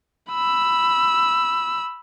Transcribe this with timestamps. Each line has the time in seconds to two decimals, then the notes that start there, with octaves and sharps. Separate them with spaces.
0.30 B5 E6